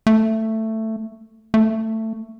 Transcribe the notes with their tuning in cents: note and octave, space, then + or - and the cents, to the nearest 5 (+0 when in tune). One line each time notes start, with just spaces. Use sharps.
A3 +10
A3 +15